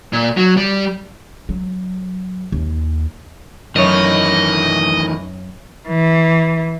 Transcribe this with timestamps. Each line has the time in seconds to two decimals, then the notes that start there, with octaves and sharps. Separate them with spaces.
0.13 A#2
0.37 F#3
0.57 G3
1.49 F#3
2.52 D#2
3.76 F#2 D#3 E3 A3 C#5 D#5
5.88 E3